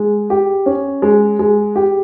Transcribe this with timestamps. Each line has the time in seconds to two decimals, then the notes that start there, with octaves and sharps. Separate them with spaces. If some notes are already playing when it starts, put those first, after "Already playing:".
Already playing: G#3
0.30 G4
0.66 C#4
1.02 G#3
1.39 G#3
1.76 G4